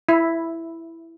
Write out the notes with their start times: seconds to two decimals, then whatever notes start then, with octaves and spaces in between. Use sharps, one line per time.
0.09 E4